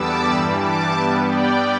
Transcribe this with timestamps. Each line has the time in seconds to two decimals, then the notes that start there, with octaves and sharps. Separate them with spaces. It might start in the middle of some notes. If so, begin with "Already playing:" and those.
Already playing: E2 D3 G3 B3 A5 D6 E6
0.24 G2 E3 G3 B5 E6
0.57 A5 D6
0.91 G2 G3 B3 E5 A5
1.23 D5 G5